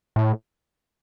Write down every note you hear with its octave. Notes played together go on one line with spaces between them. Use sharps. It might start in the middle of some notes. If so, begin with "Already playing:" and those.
A2